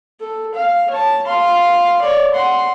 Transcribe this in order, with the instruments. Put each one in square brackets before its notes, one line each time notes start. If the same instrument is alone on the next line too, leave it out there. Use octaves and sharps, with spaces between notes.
[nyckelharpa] A4
F5
C#5 A5
F5 C6
C#5 D5
F#5 C6